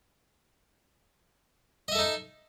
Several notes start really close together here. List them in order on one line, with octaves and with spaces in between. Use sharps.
D#5 E5 A4 D#4